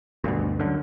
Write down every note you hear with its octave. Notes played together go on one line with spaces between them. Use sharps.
D2 G2 B2
F#2 D3